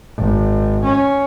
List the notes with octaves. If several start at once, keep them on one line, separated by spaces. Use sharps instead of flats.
G#1
C#4